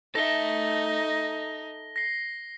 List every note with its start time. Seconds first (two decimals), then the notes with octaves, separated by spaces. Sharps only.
0.15 D#4 A4 E5 A#6 G7
1.96 A#6 C7